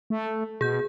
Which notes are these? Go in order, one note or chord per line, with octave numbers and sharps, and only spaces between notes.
A3
B2 G#4 G6